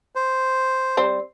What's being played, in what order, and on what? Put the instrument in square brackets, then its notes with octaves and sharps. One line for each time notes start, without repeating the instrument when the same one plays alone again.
[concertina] C5
[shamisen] G3 C4 C5